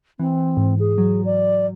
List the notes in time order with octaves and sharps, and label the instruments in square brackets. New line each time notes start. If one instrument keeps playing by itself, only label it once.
[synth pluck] E3 [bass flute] C4
[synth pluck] G#2
[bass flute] G#4
[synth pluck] F#3
[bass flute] D5